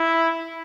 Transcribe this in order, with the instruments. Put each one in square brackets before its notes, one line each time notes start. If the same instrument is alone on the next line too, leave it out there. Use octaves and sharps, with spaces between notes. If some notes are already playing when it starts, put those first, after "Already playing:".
Already playing: [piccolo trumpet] E4